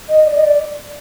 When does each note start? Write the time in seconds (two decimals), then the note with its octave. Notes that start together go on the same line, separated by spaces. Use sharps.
0.09 D#5
0.25 D5
0.34 D#5
0.41 D5